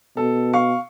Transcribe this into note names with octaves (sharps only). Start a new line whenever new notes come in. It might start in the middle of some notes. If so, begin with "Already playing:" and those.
B2 A4
F5 C#6